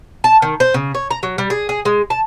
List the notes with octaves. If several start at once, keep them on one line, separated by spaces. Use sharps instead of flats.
A5
D#3
C5
C#3
C#5
A#5
F#3
G3
G#4
G#4
G#3
A5